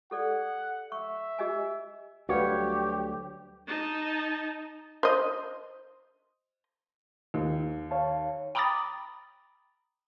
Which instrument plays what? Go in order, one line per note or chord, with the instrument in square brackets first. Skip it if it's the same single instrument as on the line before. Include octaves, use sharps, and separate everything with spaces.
[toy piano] G4 A4 D5 [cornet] F#5
[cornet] E5 [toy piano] C#6
[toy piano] G4 D#5 G#5
[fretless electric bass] D2 F#3 G3 [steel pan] F#4 B4 F5 [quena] G4 [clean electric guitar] C#5
[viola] D#4 A5
[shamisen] C5 D#5
[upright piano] D#2 [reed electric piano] D#3
[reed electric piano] C#5 F5 A5
[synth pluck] G5 A#5 B5 D6 D#6 A6